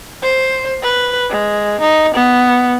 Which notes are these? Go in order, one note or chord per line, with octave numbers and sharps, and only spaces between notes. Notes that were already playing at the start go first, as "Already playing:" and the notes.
C5
B4
G#3
D#4
B3